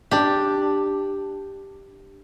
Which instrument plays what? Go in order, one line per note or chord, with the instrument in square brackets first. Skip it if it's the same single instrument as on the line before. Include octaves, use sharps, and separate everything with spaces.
[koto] D4 G4